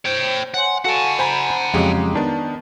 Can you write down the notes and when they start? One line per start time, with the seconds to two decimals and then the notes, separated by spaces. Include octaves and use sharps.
0.06 C5 C#5 G5
0.54 C#5 F#5 G#5 C6
0.85 F#4 A4 F5 F#5 G#5 A5 C#6
1.19 C5 G#5 A#5 B5
1.74 F2 C#3 F#3 G#3 G4
2.15 D#3 B3 D4